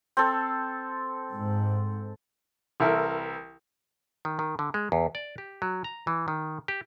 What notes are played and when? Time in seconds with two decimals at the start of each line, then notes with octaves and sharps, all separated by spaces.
0.17 C4 A4
1.34 G#2
2.80 C2 E3 E4 A4 A#4
4.25 D#3
4.39 D#3
4.59 D3
4.74 G#3
4.92 E2
5.15 D5
5.38 G4
5.62 F#3
5.84 A#5
6.07 E3
6.28 D#3
6.68 G4